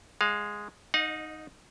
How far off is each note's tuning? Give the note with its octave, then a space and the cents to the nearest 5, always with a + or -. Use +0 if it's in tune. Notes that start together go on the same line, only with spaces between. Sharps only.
G#3 -5 F5 +20
D#4 +0 D#5 -30 F#5 -45